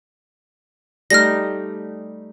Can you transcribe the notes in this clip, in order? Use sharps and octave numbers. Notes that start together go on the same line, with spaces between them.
G3 A3 D#4 F6 A#6